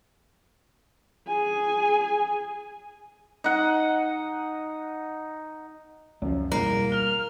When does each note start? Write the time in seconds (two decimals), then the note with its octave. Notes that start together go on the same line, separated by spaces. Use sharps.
1.28 G#4 G#5
3.44 D#4 F#5
6.22 C#2 F#2 F3
6.52 E1 E2 G3 A#3
6.92 F6 G7